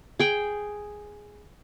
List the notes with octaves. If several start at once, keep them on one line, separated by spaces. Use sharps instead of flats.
G#4 G5